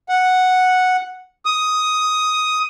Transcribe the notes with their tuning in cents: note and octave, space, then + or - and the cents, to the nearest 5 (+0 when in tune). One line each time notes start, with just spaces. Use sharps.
F#5 -5
D#6 +10